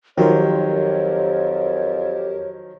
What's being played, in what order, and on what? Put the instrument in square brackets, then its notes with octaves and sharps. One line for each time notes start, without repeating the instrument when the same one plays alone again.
[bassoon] F2 [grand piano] D#3 F3 F#3 [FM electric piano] G4 A#4 C5 [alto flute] C#5